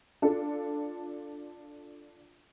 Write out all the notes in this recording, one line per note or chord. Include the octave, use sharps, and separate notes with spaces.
D4 F4 A4